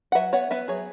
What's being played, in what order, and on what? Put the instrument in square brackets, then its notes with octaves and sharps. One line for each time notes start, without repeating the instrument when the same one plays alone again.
[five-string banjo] F#5
F#3 B4 E5
B3 C#5 F#5
B3 B4 E5
F#3 G#4 C#5